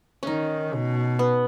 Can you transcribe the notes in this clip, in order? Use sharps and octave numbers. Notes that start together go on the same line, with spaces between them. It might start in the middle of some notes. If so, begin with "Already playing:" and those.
D#3 C#4 D#4
B2
B3